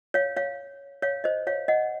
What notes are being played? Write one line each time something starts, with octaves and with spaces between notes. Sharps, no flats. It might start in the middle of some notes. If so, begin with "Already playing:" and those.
C#5 F5
C#5 F5
C#5 F5
C5 D#5
C#5 F5
D#5 F#5